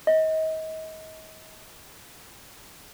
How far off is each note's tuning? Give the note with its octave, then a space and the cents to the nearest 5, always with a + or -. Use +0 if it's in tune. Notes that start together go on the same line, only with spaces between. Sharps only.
D#5 +35